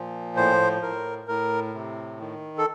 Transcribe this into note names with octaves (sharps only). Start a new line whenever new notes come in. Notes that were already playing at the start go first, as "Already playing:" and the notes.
Already playing: A#2 F3
A2 C5
A2 A#4
A2 A#4
C3
D#3
A4